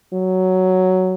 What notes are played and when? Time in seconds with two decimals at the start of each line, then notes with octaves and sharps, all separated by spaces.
0.14 F#3